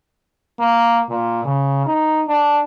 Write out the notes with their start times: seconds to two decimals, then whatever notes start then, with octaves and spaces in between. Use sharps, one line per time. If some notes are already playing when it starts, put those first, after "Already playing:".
0.60 A#3
1.10 A#2
1.45 C#3
1.86 D#4
2.27 D4